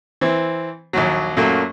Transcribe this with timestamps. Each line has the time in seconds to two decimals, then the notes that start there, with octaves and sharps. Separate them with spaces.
0.21 E3 C4
0.93 A#1 D#2 F#3
1.37 F#2 A#2 F#3 A3 A#3